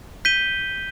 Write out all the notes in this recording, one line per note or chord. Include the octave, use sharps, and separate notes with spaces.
G6 B6 D#7 G7